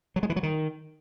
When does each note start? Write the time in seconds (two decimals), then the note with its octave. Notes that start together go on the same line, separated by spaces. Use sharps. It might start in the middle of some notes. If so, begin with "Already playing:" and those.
0.16 F#3
0.23 G#3
0.30 E3
0.36 F#3
0.43 D#3